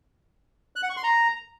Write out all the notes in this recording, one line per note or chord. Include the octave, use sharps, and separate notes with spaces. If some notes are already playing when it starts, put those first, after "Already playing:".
F#6
F#5
C#6
C6
A#5